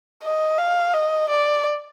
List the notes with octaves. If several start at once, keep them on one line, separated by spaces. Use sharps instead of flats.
D#5
F5
D#5
D5